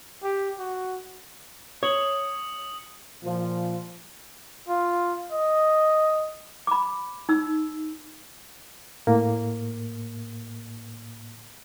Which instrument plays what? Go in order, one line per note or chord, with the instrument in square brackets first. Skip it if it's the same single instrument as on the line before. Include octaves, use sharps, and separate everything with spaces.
[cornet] G4
F#4
[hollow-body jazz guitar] C#5 [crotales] D#6 C#7 F#7
[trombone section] A#2 F3
[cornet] F4
D#5
[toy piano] B5 D6
D#4 E6
[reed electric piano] A2 A#3